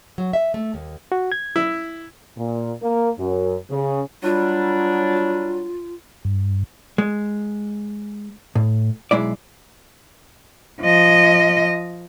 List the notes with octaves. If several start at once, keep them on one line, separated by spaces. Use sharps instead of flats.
F#3
E5
A3
D#2
F#4
G#6
E4
A#2
A#3
F#2
C#3
F#3 G3 D4 F4
G2
G#3
A2
B1 G#3 E4 D5
F3 D#5